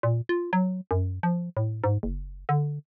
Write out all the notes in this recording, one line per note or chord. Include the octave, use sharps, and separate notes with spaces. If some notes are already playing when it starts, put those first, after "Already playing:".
A#2
F4
F#3
F#2
F3
A2
G#2
F#1
D3